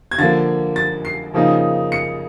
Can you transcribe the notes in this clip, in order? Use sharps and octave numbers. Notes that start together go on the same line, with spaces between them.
G#6
D3 F3 A#3 A6
A6
C7
C#3 F3 A#3 D#4
C#7